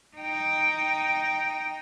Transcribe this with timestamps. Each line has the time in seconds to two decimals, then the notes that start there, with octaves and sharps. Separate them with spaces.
0.17 D#4 G5